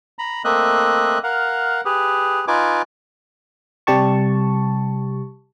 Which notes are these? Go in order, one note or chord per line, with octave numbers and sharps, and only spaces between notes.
A#5 B5
A3 A#3 C4 D#5 E5 F#6
A#4 F5 F#5
G4 G#4 B4
D#4 F4 B4 G#5 D6
C3 G3 G4 A5 C#6